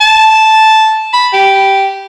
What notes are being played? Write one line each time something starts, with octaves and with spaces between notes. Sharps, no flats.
A5
B5
G4